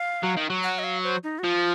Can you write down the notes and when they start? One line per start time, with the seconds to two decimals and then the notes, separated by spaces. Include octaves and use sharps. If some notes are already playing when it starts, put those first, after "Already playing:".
Already playing: F5
0.24 F#3
0.37 D#3
0.50 F#3
0.63 F#5
0.79 D#5
0.84 F5
1.04 C5
1.24 D#4
1.39 F#4
1.44 F3 F4